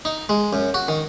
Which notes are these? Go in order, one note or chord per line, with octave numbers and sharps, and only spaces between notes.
D#4
G#3
F#2
F#4
D#3